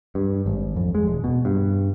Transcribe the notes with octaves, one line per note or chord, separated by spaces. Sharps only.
G2
G#1
F2
G#3
E1
B2
G2